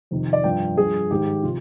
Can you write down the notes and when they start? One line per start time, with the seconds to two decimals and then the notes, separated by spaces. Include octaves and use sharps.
0.11 F2 C3 D#3
0.33 D5
0.44 G2 F3 G5
0.78 G2 F3 G#4
1.11 G#2 D#3 G4
1.43 C3 F3 F4